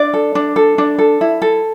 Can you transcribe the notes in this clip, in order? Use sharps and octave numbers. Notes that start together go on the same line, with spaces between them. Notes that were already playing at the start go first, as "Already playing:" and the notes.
Already playing: D4 D5
A4
D4
A4
D4
A4
E4
A4